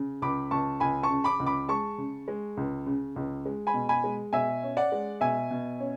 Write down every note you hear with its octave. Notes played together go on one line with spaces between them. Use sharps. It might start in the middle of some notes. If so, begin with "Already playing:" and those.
Already playing: C#3
C#2 B5 D6
C#2 A5 C#6
C#2 G#5 B5
A5 C#6
C#3
B5 D6
C#2
B5 D6
G#3 A5 C#6
C#3
G#3
C#2
C#3
C#2
G#3
G#5 B5
B2
G#5 B5
G#3
B2 E5 G#5
C#4
D5 F#5
G#3
B2 E5 G#5
B2
C#4